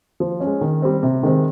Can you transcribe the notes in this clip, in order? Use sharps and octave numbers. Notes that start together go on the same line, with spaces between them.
F3
C#4
G#3
D#3
G3 C4
C3
D#3 G#3 C4